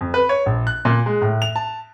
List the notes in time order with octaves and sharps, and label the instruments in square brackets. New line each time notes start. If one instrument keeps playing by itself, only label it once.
[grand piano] F2
B4
C#5
A#1
F#6
A#2
G#3
A2
F7
A5